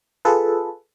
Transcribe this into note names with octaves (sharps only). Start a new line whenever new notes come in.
F4 G#4 A4 B4